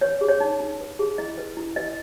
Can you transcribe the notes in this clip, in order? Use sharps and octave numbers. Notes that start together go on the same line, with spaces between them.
B4 C#5
G#4
C#5
D#4
D#4
B4
G#4
E4 D#5
B4
E4
B4 D#5